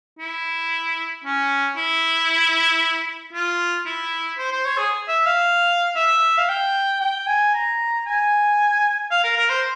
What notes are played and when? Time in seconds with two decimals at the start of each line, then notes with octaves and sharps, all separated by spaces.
0.19 E4
1.24 C#4
1.76 E4
3.33 F4
3.86 E4
4.38 C5
4.52 C5
4.65 C#5
4.78 G#4
5.08 E5
5.26 F5
5.96 E5
6.38 F5
6.49 G5
7.01 G5
7.27 G#5
7.54 A#5
8.07 G#5
9.11 F5
9.24 A#4
9.37 A#4
9.50 C5